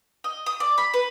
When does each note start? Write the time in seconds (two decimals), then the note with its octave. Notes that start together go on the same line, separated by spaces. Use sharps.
0.24 D#5
0.46 D#6
0.60 D5
0.78 B5
0.94 B4